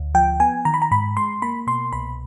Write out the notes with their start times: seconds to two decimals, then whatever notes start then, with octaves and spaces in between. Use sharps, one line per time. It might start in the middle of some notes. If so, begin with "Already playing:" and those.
Already playing: D2
0.15 F3 G5
0.40 B3 G#5
0.65 D#3 A#5
0.74 B5
0.82 A#5
0.91 G#2 B5
1.17 G#3 C6
1.42 A#3 B5
1.67 B2 C6
1.93 C2 B5